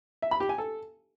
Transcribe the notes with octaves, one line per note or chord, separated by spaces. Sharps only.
E5
B5
G4
G#5
A4